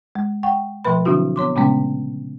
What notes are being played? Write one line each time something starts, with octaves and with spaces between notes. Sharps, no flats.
G#3
F#5 G5 C#6
B2 F3 A3 B4 B5
D3 F#3 C4 D4 E4 F#4
B3 C#5 C6 D6
A#2 C#3 G#3 A3 B3 C#4